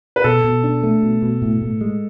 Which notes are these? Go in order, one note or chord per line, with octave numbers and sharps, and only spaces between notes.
B4
B2 A4
B2
D4
A3
B2
B2
A2
A2
G#3